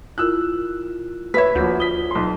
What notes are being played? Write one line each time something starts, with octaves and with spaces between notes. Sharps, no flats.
E4 F4 A#4 E6 F#6
B4 C#5 E5 B6
D2 F3 A#3 F#4 G6
F4 D#6 B6 G7
B1 C6